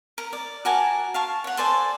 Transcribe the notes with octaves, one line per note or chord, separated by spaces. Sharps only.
A#4
D5
F#4 A#4 G#5 A5
F5 A5 C#6
C#5 F#5
A4 C5 D5 G#5